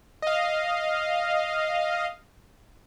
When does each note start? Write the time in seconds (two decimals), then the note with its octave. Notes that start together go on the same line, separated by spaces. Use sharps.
0.22 D#5 F5